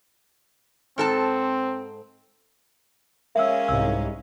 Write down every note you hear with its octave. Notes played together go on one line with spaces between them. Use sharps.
G#2 C4 A4 A5
G#3 A#3 C#4 C#5 E5 E6
C2 G#2 E6